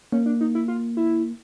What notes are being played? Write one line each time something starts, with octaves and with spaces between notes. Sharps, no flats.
A#3 C#4
D4
D#4
E4
F4
E4